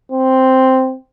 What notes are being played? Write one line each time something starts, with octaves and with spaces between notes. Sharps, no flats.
C4